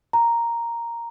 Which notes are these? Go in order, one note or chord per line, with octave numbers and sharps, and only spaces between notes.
A#5